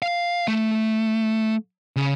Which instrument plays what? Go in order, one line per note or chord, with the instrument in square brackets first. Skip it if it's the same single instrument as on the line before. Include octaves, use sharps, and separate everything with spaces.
[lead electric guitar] F5
A3
C#3